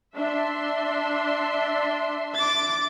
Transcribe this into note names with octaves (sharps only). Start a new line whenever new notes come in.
D4 E5 C6
D6 A6